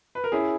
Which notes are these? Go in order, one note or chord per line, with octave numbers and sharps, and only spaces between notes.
B4
A#4
C#4 E4 G#4